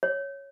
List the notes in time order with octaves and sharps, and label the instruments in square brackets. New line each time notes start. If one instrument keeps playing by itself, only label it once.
[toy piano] C#5